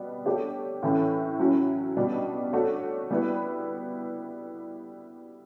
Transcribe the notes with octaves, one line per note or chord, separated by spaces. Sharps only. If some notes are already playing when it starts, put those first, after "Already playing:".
Already playing: B2 G3 B3
A3 D4 G4 C#5
A2 E3 A3 C#4 E4
F#3 C#4 E4
B2 G3 D4
A3 D4 F#4 C#5
G3 B3 E4 B4